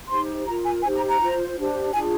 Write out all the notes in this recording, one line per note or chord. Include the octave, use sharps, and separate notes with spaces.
D#4 G4 C5 C6
F4 A#4 A#5
G#5
D#4 G4 C5 G#5
A#5
A#5
F4 C5
D4 G4 C5
D4 F4 G#4 G#5